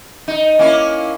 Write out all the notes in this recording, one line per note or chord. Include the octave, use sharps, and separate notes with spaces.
D#4
A#3 C#4 E4